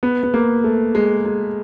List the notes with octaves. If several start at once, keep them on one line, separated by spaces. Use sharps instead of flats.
B3
B3
A#3
A3
G#3
G#3